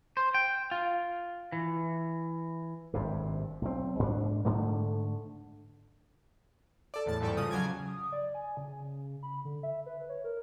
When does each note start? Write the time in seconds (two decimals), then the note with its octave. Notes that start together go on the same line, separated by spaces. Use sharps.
0.17 C5
0.34 G5
0.71 F4
1.52 E3
2.94 G#1 G2 C3
3.62 B1 C4
3.99 G#2 D4
4.45 G#2 D3 A3
6.94 A4 D5
7.06 E2 A2 A5 A6
7.21 E2 G#2 G3 A4 D5 C#6
7.37 C#3 F3 D#6
7.51 C#3 F#3 G#5 D6 G#6
7.88 D#6
8.12 D5
8.34 G#5
8.57 C#3
9.23 B5
9.45 D3
9.63 E5
9.86 B4
10.09 C#5
10.24 A#4